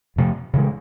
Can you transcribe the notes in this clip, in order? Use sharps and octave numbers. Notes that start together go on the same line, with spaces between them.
F2 C3 F3 A3
C#3 E3 G#3